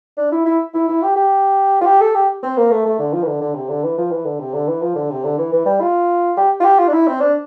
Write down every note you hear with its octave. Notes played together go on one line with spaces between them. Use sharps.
D4
E4
E4
E4
E4
G4
G4
F4
G4
A4
G4
C4
A#3
A3
A3
D3
F3
E3
D3
D3
C3
D3
E3
F3
E3
D3
C3
D3
E3
F3
D3
C3
D3
E3
E3
G3
F4
G4
F4
G4
F4
D4
E4
C4
D4